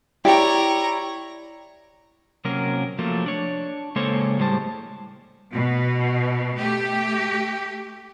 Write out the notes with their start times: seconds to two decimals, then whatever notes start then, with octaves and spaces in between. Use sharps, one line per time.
0.25 E4 G4 C#5 D5 G5 A#5
2.45 C3 F#3 A#3 C#4 A#4
2.99 F3 F#3 A3 A#3
3.26 D4 C#5
3.96 C#3 G#3 A#3 A4 C5 C#5
4.39 A2 G3 G#3 C5 A5
5.51 B2
6.58 A3 G4